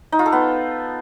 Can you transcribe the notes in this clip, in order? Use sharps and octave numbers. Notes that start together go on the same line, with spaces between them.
D#4
F4
A4
B3